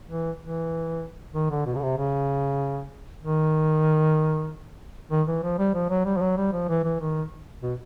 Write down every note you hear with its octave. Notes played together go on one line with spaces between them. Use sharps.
E3
E3
D#3
D3
B2
C#3
C3
C#3
D#3
D#3
E3
F3
G3
F3
F#3
G3
F3
F#3
G3
F3
E3
E3
D#3
B2